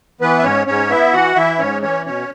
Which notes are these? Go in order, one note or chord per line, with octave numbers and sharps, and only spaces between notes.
E3 B3 B4
E5
G#2 C#4 C#5
G#2 C#4 C#5
B3 E4 E5
E3 F#4 F#5
E3 E4 E5
G#2 C#4 C#5
E3 C#4 C#5
B2 C#4 C#5